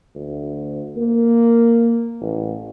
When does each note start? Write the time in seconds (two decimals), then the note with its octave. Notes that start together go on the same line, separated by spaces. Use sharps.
0.15 D2
0.97 A#3
2.21 A1